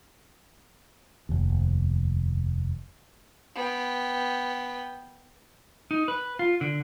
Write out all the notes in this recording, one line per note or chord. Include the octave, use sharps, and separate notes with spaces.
F1 D#2
B3 G5
D#4
B4
F4
D3